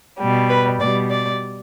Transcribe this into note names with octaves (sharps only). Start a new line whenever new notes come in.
B2 G3
B4
B2 G3 D5
D5